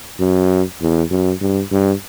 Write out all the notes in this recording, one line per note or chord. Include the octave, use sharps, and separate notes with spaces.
F#2
E2
F#2
G2
G2